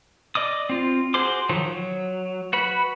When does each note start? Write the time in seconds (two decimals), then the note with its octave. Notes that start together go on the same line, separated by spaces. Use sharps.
0.35 D5 D#5 D6 D#6
0.69 C4 F4
1.14 F#4 G#4 C5 C6 D6
1.49 D#3 F3 F#3
1.67 F#3
2.53 F#4 B4 B5